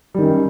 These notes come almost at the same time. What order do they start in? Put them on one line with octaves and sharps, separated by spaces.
G3 D#3 F#2